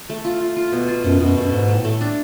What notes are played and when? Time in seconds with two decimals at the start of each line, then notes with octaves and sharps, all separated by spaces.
0.10 A3
0.25 F4
0.41 F4
0.56 F4
0.72 B2
0.88 F4
1.04 F#2 B2
1.20 F#2 B2
1.37 F#2 A3
1.52 G#2 A3
1.68 A3
1.76 A2
1.85 A3
2.01 D4